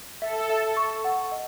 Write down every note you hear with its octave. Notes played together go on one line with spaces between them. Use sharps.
A4 E5
E5
C#6
F#5
D#5